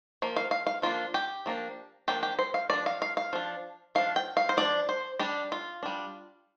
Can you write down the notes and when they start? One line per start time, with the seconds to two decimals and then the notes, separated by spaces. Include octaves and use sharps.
0.22 F3 A#3
0.36 F5
0.51 F5
0.67 F5
0.82 F3 A#3 D4 F4
1.14 G4
1.46 F3 A#3 D4
2.08 F3 A#3 D4 G4
2.23 G4
2.39 C5
2.54 F5
2.70 F3 D4 D5
2.86 F5
3.02 F5
3.17 F5
3.33 F3 D4
3.95 F3 D4 F5
4.16 G5
4.37 F5
4.49 C5
4.57 F3 D4 D5
4.89 C5
5.19 G3 D4 G4
5.52 F4
5.83 G3 D4